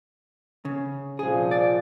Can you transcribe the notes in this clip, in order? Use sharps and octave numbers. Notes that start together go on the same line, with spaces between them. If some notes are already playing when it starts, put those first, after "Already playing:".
C#3
C2 A#2 F3 G#4
D5